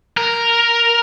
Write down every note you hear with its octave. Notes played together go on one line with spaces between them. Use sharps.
A#4